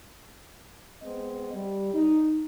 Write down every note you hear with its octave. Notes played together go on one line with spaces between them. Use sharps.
G#3 B3 C4 D#5
G3
D#4